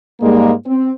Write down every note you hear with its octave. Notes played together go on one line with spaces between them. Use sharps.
G#2 G3 G#3 A#3
C4